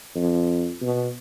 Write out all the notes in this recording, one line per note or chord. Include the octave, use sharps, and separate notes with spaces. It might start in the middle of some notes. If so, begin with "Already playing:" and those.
F2
B2